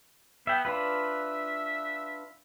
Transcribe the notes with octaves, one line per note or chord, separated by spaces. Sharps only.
B3 E5 G5
D4 F4 B4 E5